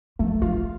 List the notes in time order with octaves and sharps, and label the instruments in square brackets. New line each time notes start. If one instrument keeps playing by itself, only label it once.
[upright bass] F3 [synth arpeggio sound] A3
[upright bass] F3 [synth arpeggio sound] F4